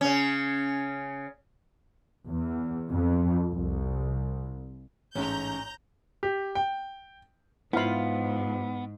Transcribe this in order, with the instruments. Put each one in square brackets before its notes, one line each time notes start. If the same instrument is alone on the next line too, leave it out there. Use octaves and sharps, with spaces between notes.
[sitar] C#3 C#4
[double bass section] E2
F2
C2
[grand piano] A1 G#2 A3 [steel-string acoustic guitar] C#4 [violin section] A#5 G6
[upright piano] G4
G5
[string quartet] G#2 [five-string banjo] F3 F4 [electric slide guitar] B3 [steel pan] E4 F5 B5